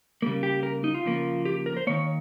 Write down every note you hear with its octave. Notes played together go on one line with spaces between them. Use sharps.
C#3 G3 A#3
G4
A#4
D#4
F4
C#3 F3 A#3
G4
A#4
C5
D#3 A#3 C#5